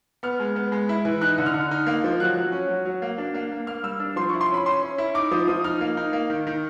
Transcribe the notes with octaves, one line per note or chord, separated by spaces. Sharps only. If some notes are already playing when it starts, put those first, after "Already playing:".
B3 F6
G#3
B3
G#3
E4
E3
D#4 F#6
D3
F6
D3
D#4
A#3
F3
F#3 F#6
F#3
C#4
F#3
F#3
A#3
D4
A#3
A#3
A#3 F6
G3 E6
D4
F3 C6
C#6
E4
C6
C#4 B5
C#4 C6
C#4
E4
D#4 D6
F3 D#6
F3 D#6
D#4 F6
A#3
D#4
A#3
D#3
D#3